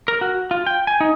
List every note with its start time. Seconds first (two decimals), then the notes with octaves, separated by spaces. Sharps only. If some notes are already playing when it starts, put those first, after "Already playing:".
0.08 A#4
0.21 F#4
0.51 F4
0.67 G5
0.87 G#5
1.01 D#4